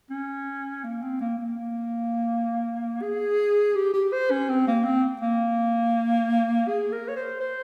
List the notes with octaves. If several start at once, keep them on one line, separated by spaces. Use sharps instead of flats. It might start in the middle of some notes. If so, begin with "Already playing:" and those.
C#4
A#3
C4
A#3
A#3
G#4
G4
G4
C5
C#4
C4
A#3
C4
A#3
G#4
A#4
C#5
C5
C5